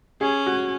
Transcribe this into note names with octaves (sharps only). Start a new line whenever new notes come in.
C#4 G#4
F#4